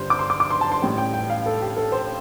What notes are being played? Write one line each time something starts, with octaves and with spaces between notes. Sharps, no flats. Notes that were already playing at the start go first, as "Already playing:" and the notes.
Already playing: G1 G2 G3 C5
D6
C6
D6
D6
C6
A5
C6
A1 A2 G3 G5
G5
G5
F5
A4
G4
A4
C5